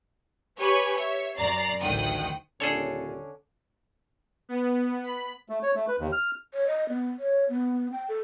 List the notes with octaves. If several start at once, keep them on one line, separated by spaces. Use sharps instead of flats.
G4 B4 C#5 G#5 B5 C#6
C#5 E5
F#2 D5 A#5 A6 C7
A1 D2 D#3 F#5 G5 D#6
D#1 D3 C#4 D4 G#4 A4 C#5
B3
B5
A3
C#5
A3
B4
D#2
F6
C#5
D#5
B3
C#5
B3
G5
A4